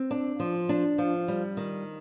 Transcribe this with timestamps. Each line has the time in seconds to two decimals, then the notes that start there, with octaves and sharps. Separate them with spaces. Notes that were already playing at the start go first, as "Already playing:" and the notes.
Already playing: C4
0.11 D4
0.40 F3
0.69 D4
0.98 F3
1.28 G3
1.57 D#3